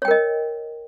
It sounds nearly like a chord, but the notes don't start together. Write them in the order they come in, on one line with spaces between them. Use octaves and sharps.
C#5 G5 A#4 D#5